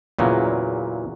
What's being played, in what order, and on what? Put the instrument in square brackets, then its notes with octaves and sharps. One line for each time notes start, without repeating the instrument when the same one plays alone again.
[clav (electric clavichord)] E2 A#2 C#3 F#3